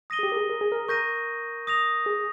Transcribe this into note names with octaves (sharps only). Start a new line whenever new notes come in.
D#6 A#6 D#7 G7
G#4
G4
A#4
G#4
A#4
G#4
A#4
A#4 C#6 G6 A#6 D#7
D#6 A#6 F7
G#4